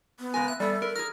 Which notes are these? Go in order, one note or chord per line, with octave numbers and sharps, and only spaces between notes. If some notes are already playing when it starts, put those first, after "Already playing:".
B3
C#3 G#3 A#4 G#5
E5 F#6
G3 A3 B3 A4
A#4 B4
G#4 A#4 F6